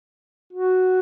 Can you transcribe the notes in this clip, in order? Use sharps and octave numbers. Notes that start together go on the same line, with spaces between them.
F#4